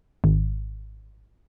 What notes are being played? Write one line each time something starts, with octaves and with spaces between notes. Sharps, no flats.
G#1